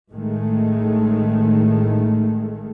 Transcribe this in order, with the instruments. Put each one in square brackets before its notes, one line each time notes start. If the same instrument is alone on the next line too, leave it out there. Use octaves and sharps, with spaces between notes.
[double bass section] A1 A2 D#3 G#3 A3